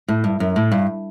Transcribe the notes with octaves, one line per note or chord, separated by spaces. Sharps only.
A2
G2
F#2
A2
G2